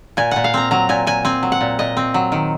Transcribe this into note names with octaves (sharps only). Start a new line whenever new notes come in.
A#2 G#5
A#2 F#5
F5
C4 A#5
F#3 A#5
A#2 G#5
A#2 G#5
C4 G#5
F#3
F#5
A#2
A#2 D#5
C4
F#3
D#3